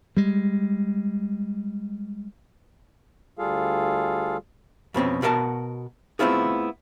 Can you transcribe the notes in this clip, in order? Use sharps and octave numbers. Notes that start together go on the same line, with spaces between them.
G3 G#3
D2 G3 F4 G#4 A4 F5
F2 B2 C4 C#4
B2 F#4 A#4 D#5 A5
A3 B3 C4 E4 F4 G#4